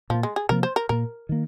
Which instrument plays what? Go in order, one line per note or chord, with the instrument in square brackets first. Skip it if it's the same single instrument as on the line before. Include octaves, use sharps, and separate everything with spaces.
[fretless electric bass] A#2 [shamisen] F3
[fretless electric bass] A#3
[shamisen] G#3
G#4
[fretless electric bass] C3 F3 A#3 [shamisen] A#4
[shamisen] C5
A#4
[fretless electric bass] A#2 A#3 [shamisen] A#4
[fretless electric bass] D#3 A#3